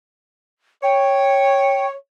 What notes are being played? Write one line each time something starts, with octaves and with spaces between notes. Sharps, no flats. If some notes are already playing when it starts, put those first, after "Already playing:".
C#5 G5